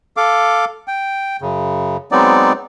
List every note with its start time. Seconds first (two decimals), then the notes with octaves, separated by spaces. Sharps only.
0.17 A4 F5 D6
0.88 G5
1.42 F#2 C#3
2.12 F#3 G#3 B3 C4 D#4 D5